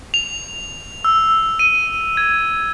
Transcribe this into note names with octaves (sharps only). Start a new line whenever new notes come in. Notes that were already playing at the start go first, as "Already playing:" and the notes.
F7
E6
D#7
G#6